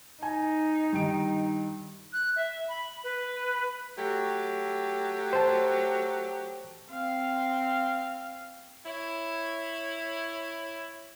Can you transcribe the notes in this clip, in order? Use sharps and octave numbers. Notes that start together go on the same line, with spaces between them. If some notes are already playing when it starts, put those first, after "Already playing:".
D#4 G#5
G2 D#3 D7
F#6
E5
B5
B4
F#3 A3 G4
C5 A5
C4 F5
E4 C#5